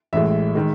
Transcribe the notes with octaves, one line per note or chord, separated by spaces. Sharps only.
A1 A2 G#3 E5
D#3 G#3